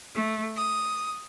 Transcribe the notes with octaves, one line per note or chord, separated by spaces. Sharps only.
A3
D#6